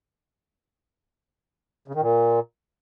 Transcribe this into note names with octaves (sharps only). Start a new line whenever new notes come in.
C#3
D#3
A#2